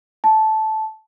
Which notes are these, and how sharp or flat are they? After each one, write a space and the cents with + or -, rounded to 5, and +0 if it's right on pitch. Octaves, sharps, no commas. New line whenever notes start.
A5 -10